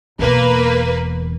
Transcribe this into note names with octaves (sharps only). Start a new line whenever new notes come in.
E1 E2 A#3 B4